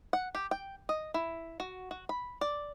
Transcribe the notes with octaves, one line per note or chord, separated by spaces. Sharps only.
F#5
G4
G5
D#5
E4
F#4
F#4
B5
D5